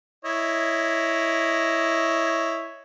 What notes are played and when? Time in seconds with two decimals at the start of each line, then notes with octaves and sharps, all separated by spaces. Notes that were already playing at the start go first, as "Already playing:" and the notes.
0.25 E4 C#5 D#5